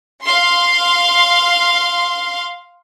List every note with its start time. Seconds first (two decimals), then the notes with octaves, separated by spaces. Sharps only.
0.23 F5 C6